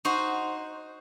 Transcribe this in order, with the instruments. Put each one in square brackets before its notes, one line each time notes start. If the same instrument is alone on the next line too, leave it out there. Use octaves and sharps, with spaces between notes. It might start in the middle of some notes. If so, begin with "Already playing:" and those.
[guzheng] D#4 F#4 C5